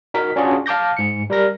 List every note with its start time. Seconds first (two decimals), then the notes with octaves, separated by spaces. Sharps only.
0.14 D#4 F#4 A#4 B6
0.36 C#4 D4 F4 F#4 G#4 D5
0.66 F5 A5 D6 G6 A#6
0.97 G#2 C#7
1.30 G3 A#4 A#6